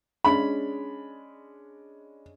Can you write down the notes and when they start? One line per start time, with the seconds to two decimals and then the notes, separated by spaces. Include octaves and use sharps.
0.25 G#3 C#4 D4 B5